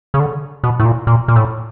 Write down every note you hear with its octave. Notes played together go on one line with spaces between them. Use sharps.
C#3
D3
B2
A2
A#2
A#2
A#2
A2